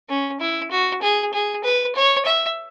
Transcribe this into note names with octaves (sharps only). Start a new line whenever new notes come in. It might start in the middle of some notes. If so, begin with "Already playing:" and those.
C#4
E4
F#4
G#4
G#4
B4
C#5
E5